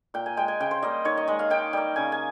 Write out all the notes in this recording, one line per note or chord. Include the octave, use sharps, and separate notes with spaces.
A#2 G5
G#5
G#3 G5
G#5
C#3 G5
C5
G3 A#3 D#5
D#3 C#5
D#5
G#3 D#5
F5
D#3 G5
G3 A#3 G5
C#3 G#5
G#5